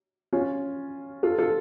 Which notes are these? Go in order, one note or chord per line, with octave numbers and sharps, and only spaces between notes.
C#4 F4
F4 A4
F4 A4